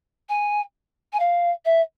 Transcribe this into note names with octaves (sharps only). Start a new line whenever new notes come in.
G#5
G#5
F5
E5